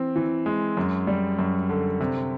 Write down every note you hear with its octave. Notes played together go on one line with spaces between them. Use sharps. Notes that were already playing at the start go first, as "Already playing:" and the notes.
Already playing: E3 C4
E3
G#3
F#2
G3
F#2
D3
C3